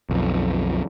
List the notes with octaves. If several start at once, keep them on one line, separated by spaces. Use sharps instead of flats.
B1 F2